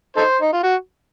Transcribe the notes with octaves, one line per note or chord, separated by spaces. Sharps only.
D#4 A4 C5
D#4
F4
F#4